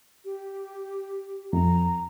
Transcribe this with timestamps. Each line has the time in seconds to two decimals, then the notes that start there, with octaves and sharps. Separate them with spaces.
0.25 G4
1.53 F2 A#5